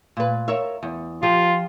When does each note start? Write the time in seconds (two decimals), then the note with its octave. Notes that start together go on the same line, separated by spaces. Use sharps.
0.17 A#2 B4
0.48 A#4 C#5 E5
0.83 E2
1.23 F3 F4 G4